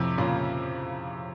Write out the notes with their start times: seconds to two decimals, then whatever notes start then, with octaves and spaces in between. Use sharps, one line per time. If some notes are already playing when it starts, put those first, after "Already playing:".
Already playing: F2 A2 C3
0.18 A#2 C#3